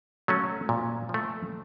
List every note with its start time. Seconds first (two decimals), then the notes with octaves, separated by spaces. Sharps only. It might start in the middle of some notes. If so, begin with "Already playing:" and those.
0.28 F#3 A3 C#4
0.69 A#2
1.09 F3
1.14 A3